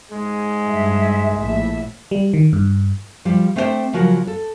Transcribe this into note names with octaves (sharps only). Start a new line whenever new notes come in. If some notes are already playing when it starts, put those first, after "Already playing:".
G#2 G#3
G2 E5
A#1 A2 E5
G3
D#3
G2
F3 G3 G4
A3 C4 D4 F#4 C5 G5
C#3 F3 F#3 F#4 A#4
A4